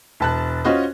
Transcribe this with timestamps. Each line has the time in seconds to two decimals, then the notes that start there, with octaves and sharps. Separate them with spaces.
0.20 E1 A5 F#6
0.65 C#4 F4 F#4 C5 D#5